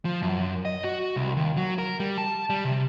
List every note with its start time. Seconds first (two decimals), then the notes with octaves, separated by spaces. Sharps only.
0.05 F3
0.22 F#2
0.65 D#5
0.84 F#4
1.16 C2
1.37 D#2
1.57 F#3
1.78 A#4
2.00 G3
2.18 A5
2.50 G3
2.65 C3